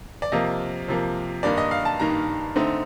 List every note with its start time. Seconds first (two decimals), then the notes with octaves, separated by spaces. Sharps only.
0.22 D5
0.32 C3 F3 A#3 D#5
0.88 C3 F3 A#3
1.43 G2 D#3 A#3 D#4 D5
1.58 D#5
1.71 F5
1.85 A5
2.00 G2 D#3 A#3 D#4 A#5
2.56 D3 A3 C4 D#4